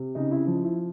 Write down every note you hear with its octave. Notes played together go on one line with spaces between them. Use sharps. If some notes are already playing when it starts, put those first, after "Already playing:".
Already playing: C3
C#3 D#4
E4
F3
E4